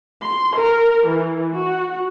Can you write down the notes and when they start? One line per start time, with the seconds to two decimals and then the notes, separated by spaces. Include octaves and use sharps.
0.23 C6
0.58 A#4
1.07 E3
1.57 F#4